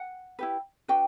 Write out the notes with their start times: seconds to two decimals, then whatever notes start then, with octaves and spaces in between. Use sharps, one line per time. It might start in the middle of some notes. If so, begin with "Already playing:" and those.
Already playing: F#5
0.39 E4 G4 B4
0.88 D4 F#4 B4 G5